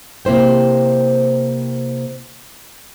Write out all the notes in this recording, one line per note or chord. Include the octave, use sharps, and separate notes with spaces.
C3 A#3 E4 C5 G5